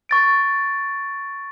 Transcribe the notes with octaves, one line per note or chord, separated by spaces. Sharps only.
C#6 A6 D7